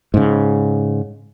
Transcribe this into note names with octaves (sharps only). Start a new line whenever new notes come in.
G#2 C#3